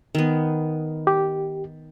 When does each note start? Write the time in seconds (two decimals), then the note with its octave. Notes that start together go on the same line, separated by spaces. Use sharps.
0.15 D#3 B3
1.07 G4